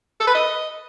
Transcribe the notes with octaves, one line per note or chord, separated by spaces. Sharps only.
A4
B4
D#5